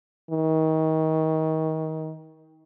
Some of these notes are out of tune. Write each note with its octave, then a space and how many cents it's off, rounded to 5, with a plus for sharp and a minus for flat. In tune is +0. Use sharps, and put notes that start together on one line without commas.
D#3 +30